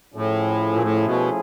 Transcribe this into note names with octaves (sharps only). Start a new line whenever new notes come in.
A2 F3 A3 C#4 E4 G#4
A#2
A2
B2